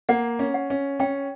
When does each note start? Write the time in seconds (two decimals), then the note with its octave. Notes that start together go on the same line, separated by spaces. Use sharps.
0.09 A#3 F#5
0.39 C#4
0.54 F#5
0.70 C#4
1.00 C#4 G5